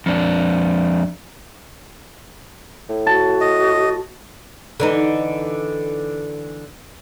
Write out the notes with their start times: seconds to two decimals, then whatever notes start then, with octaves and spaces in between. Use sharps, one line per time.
0.06 F2 D4
2.89 A2
3.07 F#4 A5
3.41 D#5
4.80 D3 E3 D#4